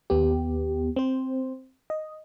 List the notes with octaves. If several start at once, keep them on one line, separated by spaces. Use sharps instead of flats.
D#2 B3 G4
C4 C5
D#5